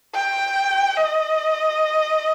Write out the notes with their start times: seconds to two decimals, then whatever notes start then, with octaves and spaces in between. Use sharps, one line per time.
0.15 G5
0.97 D#5